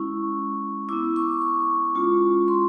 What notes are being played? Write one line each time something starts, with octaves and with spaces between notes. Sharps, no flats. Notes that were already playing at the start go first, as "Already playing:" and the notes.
Already playing: G#3 C#4 E4 C#6
B3 E4 D6
C#6
C#6
G#3 C#4 F4
C6